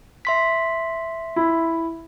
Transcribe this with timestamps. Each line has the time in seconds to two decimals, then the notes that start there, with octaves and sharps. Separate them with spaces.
0.25 E5 C6 B6
1.36 E4